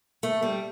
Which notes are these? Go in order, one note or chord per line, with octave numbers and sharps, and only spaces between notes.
A3
G3